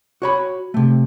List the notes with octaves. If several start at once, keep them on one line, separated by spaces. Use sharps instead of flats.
F#4 C#5 B5
C3 A3